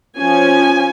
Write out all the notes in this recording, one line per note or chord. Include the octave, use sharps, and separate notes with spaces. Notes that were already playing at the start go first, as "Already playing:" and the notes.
F3 C#4 G#5